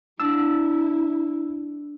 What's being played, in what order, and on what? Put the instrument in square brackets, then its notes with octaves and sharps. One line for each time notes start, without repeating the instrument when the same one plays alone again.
[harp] D4 [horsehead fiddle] E4 [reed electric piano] E6